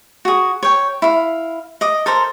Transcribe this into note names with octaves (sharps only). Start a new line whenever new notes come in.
F#4 G#4
C#5 G5
E4 F5
D#5 D6
A4 A#4 C5 A#5